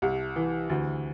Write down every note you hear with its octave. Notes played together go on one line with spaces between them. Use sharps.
C2
E3
D2